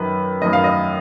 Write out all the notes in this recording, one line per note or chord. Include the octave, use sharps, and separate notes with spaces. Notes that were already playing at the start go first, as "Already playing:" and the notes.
Already playing: F#2 D#3 B4
F#2 D#3 D#5
F5
D#5